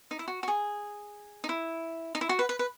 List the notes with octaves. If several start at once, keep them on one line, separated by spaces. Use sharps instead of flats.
D#4
E4
F#4
F#4
G#4
D#4
E4
D#4
E4
F#4
B4
B4
B4